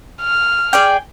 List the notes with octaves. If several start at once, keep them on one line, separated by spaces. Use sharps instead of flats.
F6
G#4 D5 G5